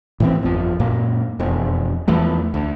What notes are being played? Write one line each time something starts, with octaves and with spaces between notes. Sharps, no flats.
A2 E3 C4
G1 F2 F3
F#2 A#2 A#3
E1 F2
E2 E3 F3 A3
D2